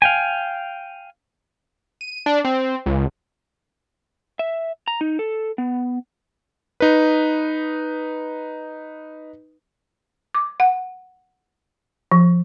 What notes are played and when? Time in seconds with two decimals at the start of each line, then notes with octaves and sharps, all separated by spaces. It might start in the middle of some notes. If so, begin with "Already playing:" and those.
0.02 F5 G5 G#5
2.01 D#7
2.26 D4
2.45 C4
2.86 C#2
4.39 E5
4.88 A#5
5.01 D#4
5.19 A4
5.58 B3
6.80 D#4 B4
10.34 D6
10.60 F#5
12.11 F3